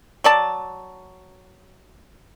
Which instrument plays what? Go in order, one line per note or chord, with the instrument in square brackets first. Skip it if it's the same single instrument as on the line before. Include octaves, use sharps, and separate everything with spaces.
[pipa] F#3 D5 A5